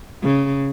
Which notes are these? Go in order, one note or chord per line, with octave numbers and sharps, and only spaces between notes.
C#3